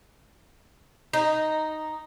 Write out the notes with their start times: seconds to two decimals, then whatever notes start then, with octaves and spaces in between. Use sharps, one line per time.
1.13 D#4